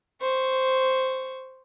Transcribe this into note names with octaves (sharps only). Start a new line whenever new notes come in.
C5 C#6